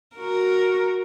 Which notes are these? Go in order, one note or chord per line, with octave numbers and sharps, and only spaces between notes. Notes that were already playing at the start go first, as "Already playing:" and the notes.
F#4 A#4